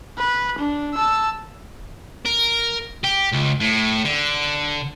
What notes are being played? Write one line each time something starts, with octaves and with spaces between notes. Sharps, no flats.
B4
D4
A5 E6
A#4
G4
C#2
A2
D3